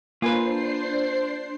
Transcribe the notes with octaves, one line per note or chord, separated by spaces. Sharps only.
A#3 D4 F4 B4 C5 G#5 C7